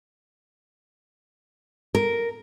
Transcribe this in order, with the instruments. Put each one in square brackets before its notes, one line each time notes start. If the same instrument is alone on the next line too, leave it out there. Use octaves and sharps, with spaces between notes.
[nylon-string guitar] A#4